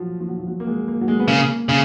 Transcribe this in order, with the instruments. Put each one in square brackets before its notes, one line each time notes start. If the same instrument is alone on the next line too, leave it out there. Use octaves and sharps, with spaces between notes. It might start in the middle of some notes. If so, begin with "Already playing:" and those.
Already playing: [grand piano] F3 F#3
F3
F#3
F3
F#3
A#3
G#3
A#3
F#3
G#3
B3
[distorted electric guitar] C#3 [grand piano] A#3
[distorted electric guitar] C#3